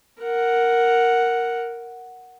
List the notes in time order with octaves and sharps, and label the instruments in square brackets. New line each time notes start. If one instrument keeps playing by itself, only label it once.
[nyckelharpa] A#4 F#5